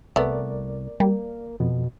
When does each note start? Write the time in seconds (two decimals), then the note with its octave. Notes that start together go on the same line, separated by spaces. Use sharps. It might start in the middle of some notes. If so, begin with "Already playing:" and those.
0.16 C2 A3 B3 A#4 D5
1.00 G3 A#3
1.60 F2 B2